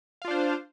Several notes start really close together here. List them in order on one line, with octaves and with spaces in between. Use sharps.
F5 F4 D4 C5